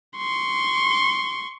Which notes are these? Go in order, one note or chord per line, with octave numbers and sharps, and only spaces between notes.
C6 C#6